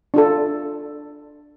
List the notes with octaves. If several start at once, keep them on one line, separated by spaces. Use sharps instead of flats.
D4 F4 A4